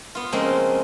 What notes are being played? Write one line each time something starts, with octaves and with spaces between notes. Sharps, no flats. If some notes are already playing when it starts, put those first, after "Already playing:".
B3 F4
C#3 F3 G#3 A#3 C4